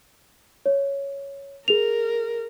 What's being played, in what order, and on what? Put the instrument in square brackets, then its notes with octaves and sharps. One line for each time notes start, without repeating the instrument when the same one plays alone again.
[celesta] C#5
[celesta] G#4 F7 [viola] A#4